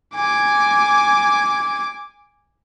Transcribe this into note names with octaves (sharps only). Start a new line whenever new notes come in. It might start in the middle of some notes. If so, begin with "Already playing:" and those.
G#5 D6